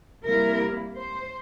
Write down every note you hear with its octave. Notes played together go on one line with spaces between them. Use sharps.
C3 G3 A#3 E4 A#4
C5